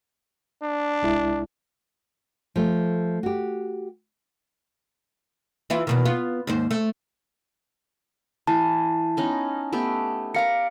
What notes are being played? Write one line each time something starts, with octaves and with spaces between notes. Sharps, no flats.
D4
C2 G#3 E4
F3 A3
F#4 G4
E3 E4 F4
E2 B2 D#3
B3 F4
D#2 G#2 C5
A3
E3 A5
B3 C#4 D#4
A3 B3 G4
A#4 D5 F5 A#5 C#7